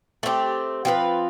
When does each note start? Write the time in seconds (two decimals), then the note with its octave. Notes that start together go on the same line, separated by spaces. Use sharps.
0.23 A3 C4 G4
0.85 F3 C4 F4 B4